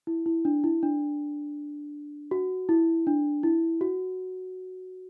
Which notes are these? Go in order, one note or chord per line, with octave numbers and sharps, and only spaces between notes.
E4
E4
D4
E4
D4
F#4
E4
D4
E4
F#4